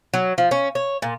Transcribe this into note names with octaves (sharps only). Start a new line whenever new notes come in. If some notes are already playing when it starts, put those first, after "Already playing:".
F#3
F3
C#4
C#5
A#2